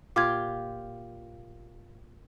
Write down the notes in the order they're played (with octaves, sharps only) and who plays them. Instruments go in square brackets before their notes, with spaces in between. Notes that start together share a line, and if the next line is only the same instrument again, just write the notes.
[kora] A#2 F4 G4 [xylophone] D6 G#6